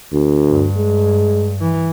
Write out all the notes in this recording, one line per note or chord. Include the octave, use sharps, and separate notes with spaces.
D2
G2
G#3
E3